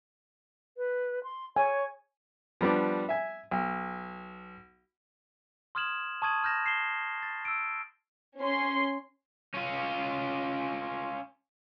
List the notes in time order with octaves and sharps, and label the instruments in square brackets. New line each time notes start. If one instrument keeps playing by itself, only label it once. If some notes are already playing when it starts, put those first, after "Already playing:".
[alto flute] B4
C6
[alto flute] C#5 [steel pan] G#5
[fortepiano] F3 G3 B3 D4
E5 G#5
B1
[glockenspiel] C6 D#6 F6 G#6 E7 F#7
A5 C#6 D#6 G#6 D#7 F#7
B5 F6 G6 A#6 E7
C7 E7 G7
A6
E6 D7
[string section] C#4 C6
[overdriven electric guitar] C#4 F4